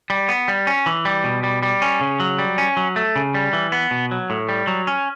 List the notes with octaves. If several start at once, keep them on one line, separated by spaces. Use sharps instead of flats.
G3
B3
G3
C#4
E3
G3
B2
G3
G3
C#4
C#3
F#3
G3
C#4
F#3
A3
C#3
G3
E3
B3
B2
F#3
A2
G3
F#3
C#4